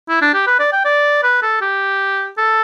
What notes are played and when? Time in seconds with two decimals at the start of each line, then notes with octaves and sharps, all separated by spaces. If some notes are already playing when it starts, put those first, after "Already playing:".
0.09 E4
0.22 D4
0.34 G4
0.47 B4
0.59 D5
0.73 G5
0.85 D5
1.23 B4
1.43 A4
1.61 G4
2.38 A4